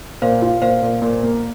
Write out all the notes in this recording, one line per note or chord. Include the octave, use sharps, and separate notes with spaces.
A#2 C5 F5
F4
A#2 C5 F5
A#2
A#2
A#3